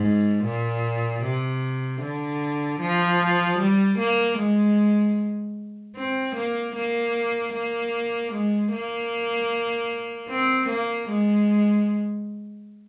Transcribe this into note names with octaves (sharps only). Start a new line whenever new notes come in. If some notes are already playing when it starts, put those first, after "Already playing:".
Already playing: G#2
A#2
C3
D3
F3
G3
A#3
G#3
C4
A#3
A#3
A#3
G#3
A#3
C4
A#3
G#3